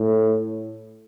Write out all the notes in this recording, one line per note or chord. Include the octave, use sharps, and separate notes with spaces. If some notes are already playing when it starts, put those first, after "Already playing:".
Already playing: A2